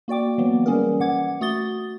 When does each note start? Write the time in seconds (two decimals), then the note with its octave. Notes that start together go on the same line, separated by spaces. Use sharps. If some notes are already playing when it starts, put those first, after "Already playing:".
0.08 A#3 F#4 D5 G5 D6
0.38 E3 F#3 A#3 B3
0.66 E3 G3 C#4 G#4 A#4
1.00 E3 F#5 D6 G#6
1.41 A3 F#4 D#6 A6 G7